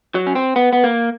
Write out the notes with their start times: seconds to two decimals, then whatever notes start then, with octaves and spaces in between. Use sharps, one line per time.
0.15 F#3
0.27 C#4
0.35 C4
0.56 B3
0.73 B3
0.84 A#3